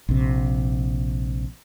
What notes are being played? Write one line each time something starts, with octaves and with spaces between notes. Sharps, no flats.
A#1 C3